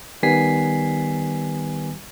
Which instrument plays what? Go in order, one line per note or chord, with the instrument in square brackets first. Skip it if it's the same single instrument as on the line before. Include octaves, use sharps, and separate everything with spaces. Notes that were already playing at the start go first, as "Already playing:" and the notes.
[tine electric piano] D#3 G3 B3 G#5 B6 C7